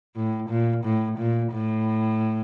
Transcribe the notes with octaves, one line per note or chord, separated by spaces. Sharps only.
A2
A#2
A2
A#2
A2